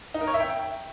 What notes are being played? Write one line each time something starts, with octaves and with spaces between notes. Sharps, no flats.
D#4
A#4
C#5
E5
G5